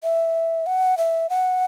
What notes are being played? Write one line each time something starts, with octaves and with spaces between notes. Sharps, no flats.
E5
F#5
E5
F#5